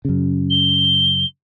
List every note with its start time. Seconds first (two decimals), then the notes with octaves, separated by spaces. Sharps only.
0.05 F#2 C#3
0.50 G7